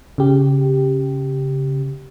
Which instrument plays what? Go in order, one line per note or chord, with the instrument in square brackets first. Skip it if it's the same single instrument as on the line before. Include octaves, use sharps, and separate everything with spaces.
[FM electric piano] C#3 G4